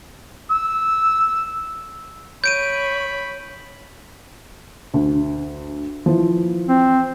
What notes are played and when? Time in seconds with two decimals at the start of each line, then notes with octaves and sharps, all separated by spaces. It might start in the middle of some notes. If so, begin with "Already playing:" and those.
0.51 E6
2.44 C#5 B5 G6 D7 D#7
4.94 D2
6.06 E3 F3
6.69 C4